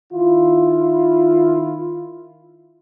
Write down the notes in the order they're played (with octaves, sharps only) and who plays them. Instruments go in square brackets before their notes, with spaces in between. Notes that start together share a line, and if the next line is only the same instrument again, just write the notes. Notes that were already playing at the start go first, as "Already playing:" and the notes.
[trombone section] D#3 E4 F4